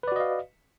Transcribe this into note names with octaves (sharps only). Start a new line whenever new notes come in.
F#4 B4 D5 D#5 F5